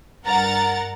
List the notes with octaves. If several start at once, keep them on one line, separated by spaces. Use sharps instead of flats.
G2 A#4 F#5 A#5 A6